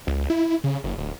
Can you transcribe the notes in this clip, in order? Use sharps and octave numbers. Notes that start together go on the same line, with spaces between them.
C#2
E4
C#3
F#1
D1